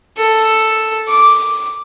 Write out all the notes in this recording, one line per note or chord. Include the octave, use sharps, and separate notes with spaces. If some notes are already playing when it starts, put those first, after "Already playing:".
A4
D6